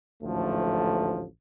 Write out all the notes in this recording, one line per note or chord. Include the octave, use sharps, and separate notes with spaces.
A1 D2 G#2 F3 A3